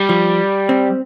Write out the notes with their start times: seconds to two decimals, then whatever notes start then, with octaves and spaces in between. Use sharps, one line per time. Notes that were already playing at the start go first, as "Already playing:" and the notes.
Already playing: G3
0.09 F3
0.69 C4